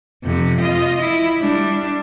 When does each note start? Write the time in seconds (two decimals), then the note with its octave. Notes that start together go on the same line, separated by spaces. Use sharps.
0.24 F2 C3
0.60 F4 D#5
1.01 E4
1.40 G3 D4